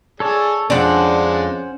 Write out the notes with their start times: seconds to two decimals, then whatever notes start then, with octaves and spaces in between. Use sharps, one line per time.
0.20 G#4 A4 C#5 D5 A5
0.70 F2 D3 G#3 C#4 D4 C5 D5 F#5